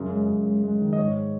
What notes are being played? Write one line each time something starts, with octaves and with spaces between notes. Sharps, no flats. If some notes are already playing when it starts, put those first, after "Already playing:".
Already playing: F#2 C#3
G#3
F#2
G#3
G#3
D#3
D#5
G#2 C#5